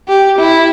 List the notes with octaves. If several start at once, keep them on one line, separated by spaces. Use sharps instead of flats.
G4
E4